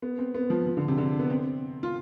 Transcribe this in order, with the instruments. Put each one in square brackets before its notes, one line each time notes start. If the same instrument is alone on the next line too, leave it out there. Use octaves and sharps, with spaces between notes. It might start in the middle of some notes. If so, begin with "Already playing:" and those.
[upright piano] B3
C4
B3
F3
F3
D3
C3
D3
B3
C4
F4